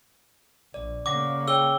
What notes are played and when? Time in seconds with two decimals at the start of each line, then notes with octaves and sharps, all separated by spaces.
0.74 A#1 D5
1.06 C#3 A#3 D5 F#5 D6 A#6
1.48 G#4 C#5 G5 E6 G7